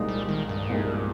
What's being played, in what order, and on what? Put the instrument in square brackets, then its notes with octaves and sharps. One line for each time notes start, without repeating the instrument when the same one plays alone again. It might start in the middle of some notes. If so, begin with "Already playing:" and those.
Already playing: [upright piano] C2 A#2 F3 G#3 D#4
[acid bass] G3
D#3
G2
[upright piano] C2 A#2 F3 G#3 D#4